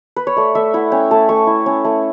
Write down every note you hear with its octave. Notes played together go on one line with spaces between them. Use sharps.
B4
C#5
A3 D5
A3 E5
E4 F#5
C#4 G5
A3 A5
A3 C#6
E4
C#4
A3